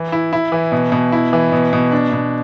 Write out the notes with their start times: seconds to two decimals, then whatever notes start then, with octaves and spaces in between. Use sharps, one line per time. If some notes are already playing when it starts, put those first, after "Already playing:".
Already playing: E3
0.12 E4
0.33 E4
0.52 E3
0.72 B2
0.92 B2
1.12 E4
1.33 E3
1.52 B2
1.73 B2
1.92 D4
2.12 B2